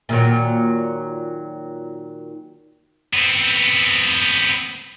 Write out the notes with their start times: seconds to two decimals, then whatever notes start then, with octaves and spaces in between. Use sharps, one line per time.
0.09 A#2 D#3 F#3
3.13 B3 C4